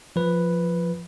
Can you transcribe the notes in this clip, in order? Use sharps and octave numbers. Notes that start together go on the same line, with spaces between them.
F3 B4